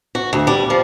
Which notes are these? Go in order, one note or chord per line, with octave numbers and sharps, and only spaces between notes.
F#4
D2
G3
F3